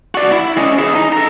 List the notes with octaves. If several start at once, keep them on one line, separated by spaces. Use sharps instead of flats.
F#4 D5
E4
C#4 D#5
E4 G#4
D#4
A4 A#5